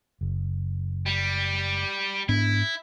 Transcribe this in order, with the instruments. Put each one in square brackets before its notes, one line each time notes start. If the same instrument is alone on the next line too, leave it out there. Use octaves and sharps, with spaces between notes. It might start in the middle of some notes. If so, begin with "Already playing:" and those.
[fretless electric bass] F#1
[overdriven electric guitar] G3
[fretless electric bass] G#2 B3 D4 [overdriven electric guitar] E4